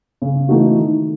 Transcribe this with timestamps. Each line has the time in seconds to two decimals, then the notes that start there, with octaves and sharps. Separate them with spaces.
0.22 C#3
0.49 E3 A3 D#4 F#4
0.75 D#3